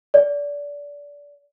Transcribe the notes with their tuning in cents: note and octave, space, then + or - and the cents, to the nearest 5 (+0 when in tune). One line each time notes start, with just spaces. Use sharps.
D5 -25